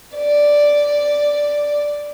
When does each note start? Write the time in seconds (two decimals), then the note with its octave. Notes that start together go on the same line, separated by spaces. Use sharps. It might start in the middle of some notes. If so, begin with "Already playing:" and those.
0.15 D5